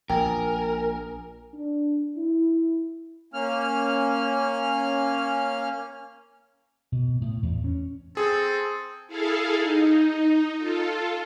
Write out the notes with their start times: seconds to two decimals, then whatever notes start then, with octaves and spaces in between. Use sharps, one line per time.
0.10 A#1 A#4 G5 G#5
1.54 D4
2.17 E4
3.34 A#3 C#4 F6
6.92 B2
7.21 A2
7.43 E2
7.64 C#4
8.17 C4 G#4 A4
9.07 E4 G#4 A4 F5
9.60 D#4
10.58 F4 A4